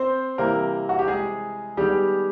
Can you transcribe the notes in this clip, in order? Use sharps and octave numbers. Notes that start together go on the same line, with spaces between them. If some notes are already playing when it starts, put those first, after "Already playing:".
Already playing: C4 C5
C3 E3 G3 A#3 C4 A#4
F#4
G4
G#3 G#4
D#3 G3 G#3 B3 G4